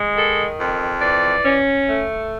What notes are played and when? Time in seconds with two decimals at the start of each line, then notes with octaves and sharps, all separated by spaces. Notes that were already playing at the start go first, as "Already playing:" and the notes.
Already playing: G#3
0.16 D#3 A4
0.59 F2
1.01 E3 D5
1.44 C#4
1.88 A3